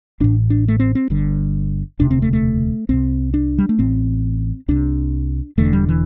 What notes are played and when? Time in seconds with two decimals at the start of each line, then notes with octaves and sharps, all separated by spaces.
0.20 A1 A2 D4
0.50 D4
0.68 A3
0.80 C4
0.95 C4
1.10 G1 G2 D3
1.99 E1 D2 C3 D4
2.11 C4
2.22 A3
2.33 A3
2.89 C2 C3 C4
3.34 D4
3.58 G3
3.69 A3
3.79 A1 A2 C4
4.68 C2 C3 D4
5.58 E1 E2 D3 A3
5.73 G3
5.89 E3